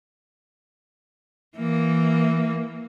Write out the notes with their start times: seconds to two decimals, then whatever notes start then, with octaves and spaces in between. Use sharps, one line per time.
1.57 E3 A#3